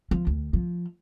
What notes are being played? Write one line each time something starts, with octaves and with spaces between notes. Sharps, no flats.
F3
D2
F3